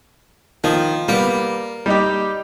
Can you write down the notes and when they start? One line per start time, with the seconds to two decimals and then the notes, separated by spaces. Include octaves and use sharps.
0.64 D#3 F3
1.08 G3 A#3 B3
1.86 G3 D#4 G4